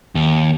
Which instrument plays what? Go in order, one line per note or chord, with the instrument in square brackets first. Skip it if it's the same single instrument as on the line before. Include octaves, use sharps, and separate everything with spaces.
[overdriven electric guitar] D#2